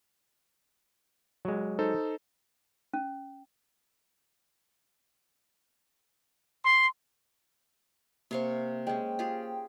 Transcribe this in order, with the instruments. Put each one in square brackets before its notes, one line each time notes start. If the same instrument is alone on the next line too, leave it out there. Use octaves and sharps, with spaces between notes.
[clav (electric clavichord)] F#3 G#3
[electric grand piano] D#4 A4 C5
[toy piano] C#4
[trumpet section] C6
[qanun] C3 F5 C#6 [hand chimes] A#3 C5
[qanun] G#3 C#4 [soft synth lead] G5
[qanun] F4 G4 G#4